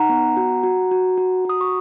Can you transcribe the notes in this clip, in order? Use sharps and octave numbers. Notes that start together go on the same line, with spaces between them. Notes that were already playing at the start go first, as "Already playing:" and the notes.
Already playing: D#4 F#5 A#5
B3
F#4
F#4
F#4
F#4
F#4 D#6
C#6